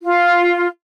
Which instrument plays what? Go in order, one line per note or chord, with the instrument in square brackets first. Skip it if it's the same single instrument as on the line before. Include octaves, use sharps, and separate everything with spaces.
[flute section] F4